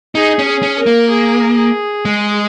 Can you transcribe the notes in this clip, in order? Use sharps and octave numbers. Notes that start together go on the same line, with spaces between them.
D#4 G#4
C#4
G#4
C#4
A#4
A#3
G#4
G#4
G#3